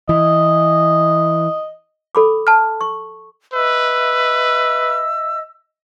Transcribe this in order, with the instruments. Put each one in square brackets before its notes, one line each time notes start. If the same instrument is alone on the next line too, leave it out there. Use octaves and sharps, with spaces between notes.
[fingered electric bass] E3 [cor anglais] D#5
[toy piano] A4 B5 D6
[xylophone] A5 F6
[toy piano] C#6
[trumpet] B4 [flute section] D#5 E5 E6